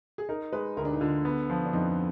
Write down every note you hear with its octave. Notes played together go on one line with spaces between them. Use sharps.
G#4
D#4 A#4
G#3 B4
D2 A#4
D4
D#4
D3 F4
B3
F3
D4
F2 D#4